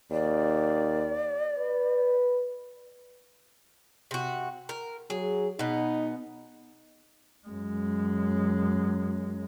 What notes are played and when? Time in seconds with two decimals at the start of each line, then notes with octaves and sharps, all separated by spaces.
0.11 D#2 D5
1.58 B4
4.11 C3 F#4
4.69 A#4
5.10 F#3 G#4
5.59 B2 B3 D#4
7.47 F#2 G#3